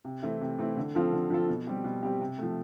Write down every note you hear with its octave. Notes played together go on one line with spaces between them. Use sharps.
C3
E3 A3 C4 E4
C3
E3 A3 C4 E4
D3
F3 C4 F4 A4
D3
F3 C4 F4 A4
B2
G3 C4 G4
B2
G3 C4 G4
C3
F3 A3